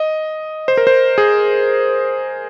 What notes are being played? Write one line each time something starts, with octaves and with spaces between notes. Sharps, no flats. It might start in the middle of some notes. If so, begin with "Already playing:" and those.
Already playing: D#5
C5
A#4
C5
G#4